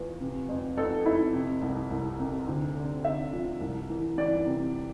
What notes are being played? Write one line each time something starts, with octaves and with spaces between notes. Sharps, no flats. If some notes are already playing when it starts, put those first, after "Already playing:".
Already playing: E2 F3
C3
F2
F2 A4
F2 E4
C3
C2
C2
C3
D2
D3
D3 E5
F3
C2
E3
E3 D5
C3